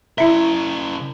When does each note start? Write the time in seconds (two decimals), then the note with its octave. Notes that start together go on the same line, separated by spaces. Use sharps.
0.18 C#3 E4 A#4 E5